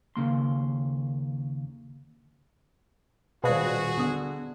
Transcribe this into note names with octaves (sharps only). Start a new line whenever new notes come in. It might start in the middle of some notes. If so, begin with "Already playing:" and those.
D#2 C#3 A#3 C6
D#1 B2 F#4 G#4 C5 D5 F5
D3 B3 D#6